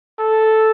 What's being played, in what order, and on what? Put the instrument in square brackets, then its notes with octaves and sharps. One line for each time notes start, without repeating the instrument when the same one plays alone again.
[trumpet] A4